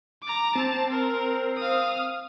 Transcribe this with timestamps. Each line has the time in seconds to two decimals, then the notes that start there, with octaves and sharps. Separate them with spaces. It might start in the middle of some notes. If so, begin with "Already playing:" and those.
0.23 A#5 D6
0.55 C4 A5
0.91 A#4
1.57 F5 D#6